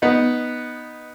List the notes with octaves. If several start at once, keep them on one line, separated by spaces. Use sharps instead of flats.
B3 D#4